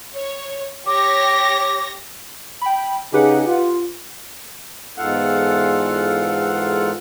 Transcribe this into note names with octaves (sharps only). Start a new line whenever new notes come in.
C#5
G4 C#5 D6 A#6
G5 B5
C#3 D#4 G4 G#4 B4 F#5
F4
E2 G#2 F4 A4 F5 F#5